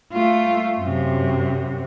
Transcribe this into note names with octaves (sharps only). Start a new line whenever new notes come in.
A3 F4
F#2 C3